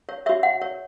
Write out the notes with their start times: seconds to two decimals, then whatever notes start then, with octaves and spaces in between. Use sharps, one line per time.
0.09 C#5
0.26 F#4 C#5 E5
0.43 F#5
0.62 C#5